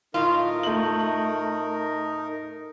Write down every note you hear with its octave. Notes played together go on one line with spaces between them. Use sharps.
A2 D#4 F4 A#4
A3 F#7